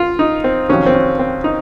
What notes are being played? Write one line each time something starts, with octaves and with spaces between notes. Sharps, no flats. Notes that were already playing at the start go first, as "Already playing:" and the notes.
Already playing: F4
D#4
C4
F2 C3 D#3 F#3 C#4
C4
C#4
C4
D#4